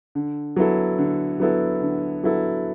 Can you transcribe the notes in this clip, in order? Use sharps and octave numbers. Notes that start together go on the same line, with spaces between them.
D3
F#3 B3 E4 A4
D3
F#3 B3 E4 A4
D3
F#3 B3 E4 A4